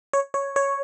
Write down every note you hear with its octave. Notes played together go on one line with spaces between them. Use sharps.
C#5
C#5
C#5